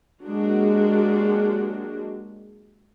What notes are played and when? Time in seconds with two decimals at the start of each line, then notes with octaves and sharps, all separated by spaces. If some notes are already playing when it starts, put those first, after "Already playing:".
0.22 F#3 G#3 A#3 D4 F#4 G4